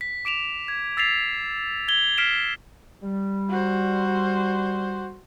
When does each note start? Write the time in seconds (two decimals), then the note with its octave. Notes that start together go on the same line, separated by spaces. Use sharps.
0.01 B6
0.25 D6 D7 E7 F7
0.68 G#6
0.97 E6 A6 B6 C7 F7
1.88 G#6 G7
2.18 F6 B6 C7 D7 E7 G7
3.03 G3
3.49 F#4 C5